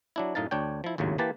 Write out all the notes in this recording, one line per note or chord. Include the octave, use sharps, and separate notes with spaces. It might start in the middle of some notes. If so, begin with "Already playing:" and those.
F#3 D4 E4
F#2 A2 D#4 F5 A5
D2 D4 C#5 G5
F3 E4
G#1 D#2 A2 C#3 F#3
E3 A#3 G4 B4 A5